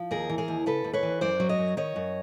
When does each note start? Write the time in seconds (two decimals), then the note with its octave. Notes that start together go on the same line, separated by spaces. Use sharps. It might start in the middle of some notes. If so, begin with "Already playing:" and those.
Already playing: F3
0.11 D#2 G#4 A#4
0.30 E3
0.38 G#4 A#4
0.48 D#2
0.66 C#3 A4 B4
0.84 D#2
0.93 B4 C#5
1.03 E3
1.21 F#2 C5 D5
1.40 F#3
1.49 C#5 D#5
1.58 F#2
1.77 D#3 C#5 D#5
1.96 F#2